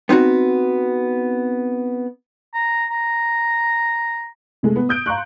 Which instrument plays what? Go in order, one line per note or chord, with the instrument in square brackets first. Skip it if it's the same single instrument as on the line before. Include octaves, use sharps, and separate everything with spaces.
[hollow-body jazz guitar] B3 C4 D#4 F#4
[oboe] A#5
A#5
[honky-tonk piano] C3 G#3 A3
B3
D#6 G6 D7
F5 A#5 C6 C#6 F#6